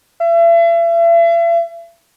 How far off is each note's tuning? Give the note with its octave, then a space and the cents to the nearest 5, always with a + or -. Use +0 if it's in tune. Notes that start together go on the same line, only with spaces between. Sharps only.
E5 +40